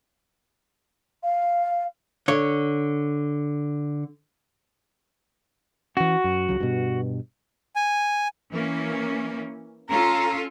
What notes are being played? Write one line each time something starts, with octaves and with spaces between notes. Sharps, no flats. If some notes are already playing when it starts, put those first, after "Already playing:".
F5
D3 C#5
E3 C#4 F#4
F#2
C#2 C#3 F#3
G2 B2
G#5
E3 A#3 C#4
C#4 F4 A4 A#5